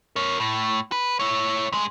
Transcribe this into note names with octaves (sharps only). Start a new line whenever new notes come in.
A#4 C#5
A2
B4
E4 C#5
G2 G#3